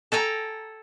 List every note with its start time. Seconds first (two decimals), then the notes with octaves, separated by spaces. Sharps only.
0.12 A4 G5 G#5 A#5